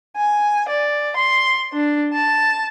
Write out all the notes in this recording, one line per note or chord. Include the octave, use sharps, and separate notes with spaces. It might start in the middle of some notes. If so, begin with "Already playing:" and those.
G#5
D5
C6
D4
A5